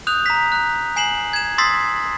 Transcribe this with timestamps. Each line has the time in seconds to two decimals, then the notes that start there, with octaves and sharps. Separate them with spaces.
0.07 D#6 F#6 G6 F7
0.26 A#5 B6
0.52 F#6
0.96 G#5 C7 E7 F#7
1.33 G#6 E7
1.58 C6 D#6 E6 A6 B6 C7